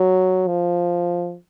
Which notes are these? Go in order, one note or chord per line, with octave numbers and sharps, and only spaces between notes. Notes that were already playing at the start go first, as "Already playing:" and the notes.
Already playing: F#3
F3